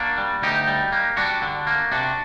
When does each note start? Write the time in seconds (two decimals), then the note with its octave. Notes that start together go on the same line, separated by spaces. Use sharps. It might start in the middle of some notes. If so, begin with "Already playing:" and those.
Already playing: A#3 D4 F#4
0.18 G3
0.42 D2 D#4 G4
0.67 G3
0.92 A#3
1.17 G3 D4 F#4
1.42 D3
1.67 A#3
1.92 C3 D4 F#4